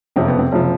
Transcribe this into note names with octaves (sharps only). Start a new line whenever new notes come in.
F#1 F2 C3 F3 C4
B3
C4
F#1 C3 F3